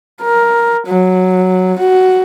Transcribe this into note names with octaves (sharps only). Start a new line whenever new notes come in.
A#4
F#3
F#4